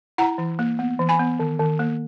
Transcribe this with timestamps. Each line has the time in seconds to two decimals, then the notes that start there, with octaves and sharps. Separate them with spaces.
0.18 E4 F#5 A#5
0.38 E3
0.59 A#3
0.79 B3
0.99 E3
1.09 G#5 B5
1.19 B3
1.40 D#3
1.59 D#3
1.79 A#3